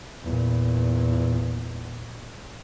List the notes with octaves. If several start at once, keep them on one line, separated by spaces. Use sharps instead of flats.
E2 A#2